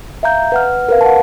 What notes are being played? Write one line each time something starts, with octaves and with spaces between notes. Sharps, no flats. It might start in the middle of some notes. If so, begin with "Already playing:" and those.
E5 F5 A#5 G6
B4 F#5 F6
A#4 B4 F5
F#5 A5